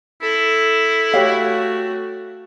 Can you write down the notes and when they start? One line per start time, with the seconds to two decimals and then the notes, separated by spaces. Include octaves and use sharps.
0.22 E4 A4
1.14 A3 F#4 G4 C#5 F5